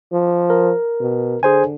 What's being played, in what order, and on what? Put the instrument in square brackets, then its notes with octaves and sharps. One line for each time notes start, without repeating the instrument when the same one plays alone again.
[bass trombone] F3
[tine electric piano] A#4
[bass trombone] B2
[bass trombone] D3 [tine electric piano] G#4 C5 G#5